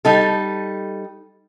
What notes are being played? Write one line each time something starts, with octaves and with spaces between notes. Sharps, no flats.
G3 D#4 A4